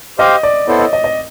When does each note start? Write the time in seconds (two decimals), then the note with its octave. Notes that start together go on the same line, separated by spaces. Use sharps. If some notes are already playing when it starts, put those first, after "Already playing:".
0.18 G4 C5 D#5 F5
0.43 D5
0.68 B3 E4 A4 C5 C#5
0.79 D#5
0.93 D#5
1.04 D#5